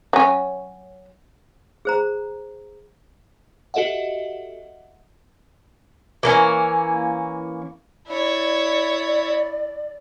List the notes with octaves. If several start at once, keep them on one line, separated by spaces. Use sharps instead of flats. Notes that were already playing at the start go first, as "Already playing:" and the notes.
F#3 C#4
G#4 C5 A#5
F#4 G4 A4 D#5 E5 F#5
E3 A#3 C#4
E4 C#5 D5